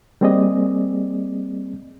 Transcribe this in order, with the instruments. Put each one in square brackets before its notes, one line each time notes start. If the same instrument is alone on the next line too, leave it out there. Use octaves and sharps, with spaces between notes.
[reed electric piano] G3 A#3 C4 G#4 D5 D#5